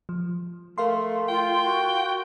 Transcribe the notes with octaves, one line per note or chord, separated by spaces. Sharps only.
F3
A3 A#4 F5 C6
F4 G5
F#4